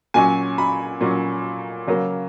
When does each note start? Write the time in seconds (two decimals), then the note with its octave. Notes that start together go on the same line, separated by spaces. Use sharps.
0.14 A#2 F#3 C#4 G#5
0.58 B5
1.01 A#2 F#3 C#4
1.87 C#3 F#3 A#3